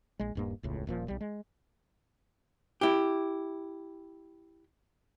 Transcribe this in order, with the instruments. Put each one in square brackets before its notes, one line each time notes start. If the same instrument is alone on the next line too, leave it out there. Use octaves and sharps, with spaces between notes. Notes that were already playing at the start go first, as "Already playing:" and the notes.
[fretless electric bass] A#1 G#3
D#1 G2 A#3
E1 C#2 A2
D#1 A#2 F3
B1 G3
G#3
[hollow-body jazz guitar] E4 G4